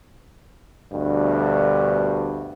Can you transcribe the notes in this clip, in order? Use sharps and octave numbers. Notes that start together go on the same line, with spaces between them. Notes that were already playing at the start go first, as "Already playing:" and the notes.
D2 G2 B2